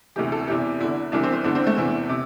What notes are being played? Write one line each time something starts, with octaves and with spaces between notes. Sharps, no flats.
D2 C3 E3 G4
A4
E2 C3 E3 G4
E2 D3 E4
C2 C3 E3 D4
C4
C4
E2 D3 D4
C4
A3
E2 C3 E3
C3